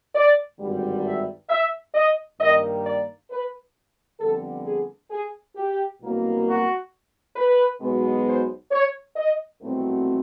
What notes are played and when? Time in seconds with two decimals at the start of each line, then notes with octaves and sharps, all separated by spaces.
0.15 D5
0.59 G#1 G2 D3 G3
1.04 E5
1.49 E5
1.94 D#5
2.39 G2 D#3 G3 A#3 D#5
2.85 D5
3.30 B4
4.20 F2 D3 G3 B3 A4
4.65 G#4
5.10 G#4
5.55 G4
6.01 C2 B2 F#3 A#3
6.45 F#4
7.36 B4
7.80 B1 B2 G#3 B3
8.26 C5
8.71 C#5
9.16 D#5
9.61 C2 B2 F#3 A3 C4